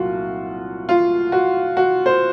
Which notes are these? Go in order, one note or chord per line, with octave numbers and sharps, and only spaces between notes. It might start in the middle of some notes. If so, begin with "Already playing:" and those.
Already playing: C2 A#2 F#3 F4 F#4
F4
F#4
F#4
C5